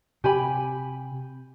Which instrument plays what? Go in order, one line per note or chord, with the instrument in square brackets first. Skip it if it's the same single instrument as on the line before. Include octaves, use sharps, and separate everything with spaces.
[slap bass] C3 C4 [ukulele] G4 G#5 B5